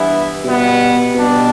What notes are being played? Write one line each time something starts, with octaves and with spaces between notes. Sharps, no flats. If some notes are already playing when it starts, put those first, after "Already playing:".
Already playing: G2 E3 B3 E4
B2 G3 B3
B2 G3 D4